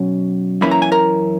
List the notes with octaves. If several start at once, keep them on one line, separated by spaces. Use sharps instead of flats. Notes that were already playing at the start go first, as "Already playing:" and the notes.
Already playing: B2 F#3 C#4
F#2 E3 A#3 C#4 E4 B5
A#5
G#5
A#4 A#5